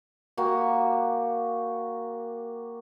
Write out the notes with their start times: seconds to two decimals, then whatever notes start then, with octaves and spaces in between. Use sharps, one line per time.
0.37 A#3 F#4 G4